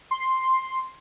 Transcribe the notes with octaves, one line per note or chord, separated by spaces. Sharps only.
C6